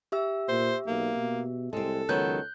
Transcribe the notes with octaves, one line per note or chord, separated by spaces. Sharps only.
G4 E5 E6
A#2 C5
B1 A#3
B2
C2 G#3 C4 A4
C#2 D#3 F#3 B3 F#6 G6